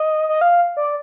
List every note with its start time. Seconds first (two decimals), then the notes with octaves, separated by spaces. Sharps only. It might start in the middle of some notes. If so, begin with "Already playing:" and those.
Already playing: D#5
0.29 D#5
0.41 F5
0.77 D5